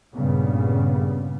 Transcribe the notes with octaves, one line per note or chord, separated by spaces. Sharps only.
G2 A#2 C#3 B3